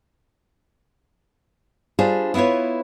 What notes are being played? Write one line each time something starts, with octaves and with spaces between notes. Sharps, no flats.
G3 D4 F4 G#4 C5
B3 E4 F4 B4 C#5